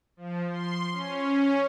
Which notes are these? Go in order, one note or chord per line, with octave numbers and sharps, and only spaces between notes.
F3
C6
C#4